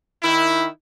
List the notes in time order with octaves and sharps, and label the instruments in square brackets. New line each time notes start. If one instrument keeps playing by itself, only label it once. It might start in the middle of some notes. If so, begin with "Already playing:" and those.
[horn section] D#3 E4